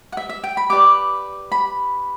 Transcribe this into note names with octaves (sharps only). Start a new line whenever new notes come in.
F#5
E5
E5
G5
B5
G4 B4 D5 D6
B5